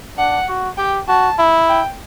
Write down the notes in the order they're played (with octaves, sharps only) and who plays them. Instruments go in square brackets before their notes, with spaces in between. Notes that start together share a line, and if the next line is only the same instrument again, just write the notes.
[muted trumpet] D4 [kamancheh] F#5
[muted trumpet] F#4
[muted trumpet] G4 [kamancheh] G5
[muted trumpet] F#4 [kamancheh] A5
[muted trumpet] E4
[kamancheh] G5